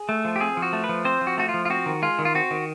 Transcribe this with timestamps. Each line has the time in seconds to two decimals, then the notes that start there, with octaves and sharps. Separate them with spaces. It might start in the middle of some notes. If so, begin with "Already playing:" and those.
Already playing: G#4
0.09 A3
0.25 F3
0.36 G4
0.41 C4 G#4
0.57 F3
0.62 F#4
0.73 A3
0.84 B4
0.89 F3
1.05 C4 C5
1.21 F3
1.27 F#4
1.37 A3 F#4
1.49 F4
1.54 F3
1.65 F4
1.70 C4 F#4
1.86 D#3
2.02 G#3 F4
2.19 D#3
2.25 F4
2.35 C4 F#4
2.51 D#3